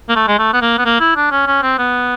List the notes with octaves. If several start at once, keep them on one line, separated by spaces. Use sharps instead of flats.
A#3
A3
G#3
A3
B3
A#3
B3
A#3
E4
D4
C#4
C#4
C4
B3